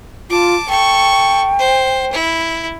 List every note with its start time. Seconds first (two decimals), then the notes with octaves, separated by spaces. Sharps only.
0.30 F4 A5 D6
0.69 A4 G5 C#6
1.59 C5
2.13 E4